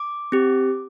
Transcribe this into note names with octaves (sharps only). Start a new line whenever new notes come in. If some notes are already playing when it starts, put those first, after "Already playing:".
Already playing: D6
C4 G4